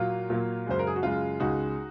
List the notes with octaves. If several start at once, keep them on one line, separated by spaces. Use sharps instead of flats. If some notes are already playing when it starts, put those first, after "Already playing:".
Already playing: A#2 F#3 A#3 F4
A#2 F#3 A#3
F#2 C#3 G#3 C5
A#4
G#4
F#4
F#2 C#3 G#3 F4
C#2 C#3 G#3 D#4 F#4